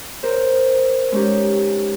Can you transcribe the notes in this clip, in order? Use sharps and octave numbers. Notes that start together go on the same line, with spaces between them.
A#4 C5
G#3 C#4 D#4 G4